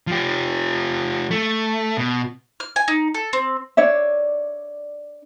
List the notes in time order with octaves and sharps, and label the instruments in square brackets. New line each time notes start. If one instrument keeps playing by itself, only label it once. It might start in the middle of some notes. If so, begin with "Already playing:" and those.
[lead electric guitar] F3 G4
A3
B2
[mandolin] F6
G#5
D#4
A4
C4
[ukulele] D4 C#5 D5 E5